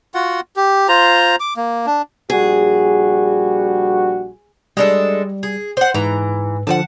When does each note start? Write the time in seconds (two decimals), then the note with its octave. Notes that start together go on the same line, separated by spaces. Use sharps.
0.14 F4 F#4 F#5
0.56 G4
0.89 F4 C5 A#5
1.40 D6
1.57 A#3
1.86 D4
2.30 A#1 G3 F#4 G#4
4.77 G3 G#3 D4 A4
5.43 G#4
5.77 C5 F#5
5.94 G#2 E3 B4 A#5
6.67 D3 F3 F#5 G#5 A5